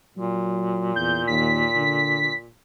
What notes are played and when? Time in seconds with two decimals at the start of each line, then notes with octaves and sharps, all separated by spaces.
0.17 A#2 F#3
0.96 E2 G6
1.28 D#2 B6
1.76 D3